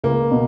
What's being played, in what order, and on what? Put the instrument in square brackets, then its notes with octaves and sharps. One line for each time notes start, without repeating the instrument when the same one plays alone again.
[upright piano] C#2 [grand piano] A#3
[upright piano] B2